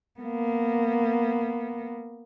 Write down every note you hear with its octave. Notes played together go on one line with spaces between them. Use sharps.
A#3 B3